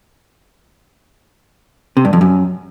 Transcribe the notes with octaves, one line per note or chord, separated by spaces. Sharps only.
C3
G2
F2
F#2